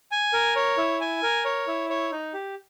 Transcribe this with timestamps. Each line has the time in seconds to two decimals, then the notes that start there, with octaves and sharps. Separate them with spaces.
0.12 G#5
0.33 A#4
0.56 C#5
0.77 E4
1.01 G#5
1.23 A#4
1.45 C#5
1.67 E4
1.90 C#5
2.12 D#4
2.34 G4